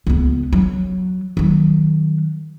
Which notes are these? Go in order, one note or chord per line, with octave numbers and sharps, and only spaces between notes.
C#2 B3
F#3
D#3 F#3